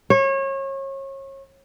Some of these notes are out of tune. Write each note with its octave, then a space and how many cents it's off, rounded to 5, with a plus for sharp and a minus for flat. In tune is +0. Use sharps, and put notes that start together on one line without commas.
C#5 -30